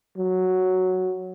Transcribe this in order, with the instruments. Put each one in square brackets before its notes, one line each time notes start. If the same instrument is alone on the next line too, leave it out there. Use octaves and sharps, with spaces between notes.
[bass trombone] F#3